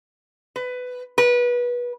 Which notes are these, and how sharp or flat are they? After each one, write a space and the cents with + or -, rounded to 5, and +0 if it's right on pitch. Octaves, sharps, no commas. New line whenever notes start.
B4 +15
B4 -25